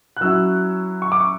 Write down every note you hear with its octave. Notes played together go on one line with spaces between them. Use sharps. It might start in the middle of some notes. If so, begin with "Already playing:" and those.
F#6
F#3 C#4 E4 E6
C#6
D6
C#6